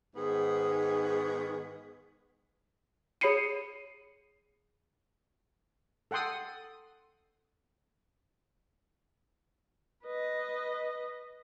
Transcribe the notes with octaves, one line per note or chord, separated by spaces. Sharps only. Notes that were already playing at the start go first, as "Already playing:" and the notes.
G#2 D#3 B3 G#4
G#4 C#5 B5 C7 C#7 D#7
A4 F#5 G5 C6 D#6
B4 D#5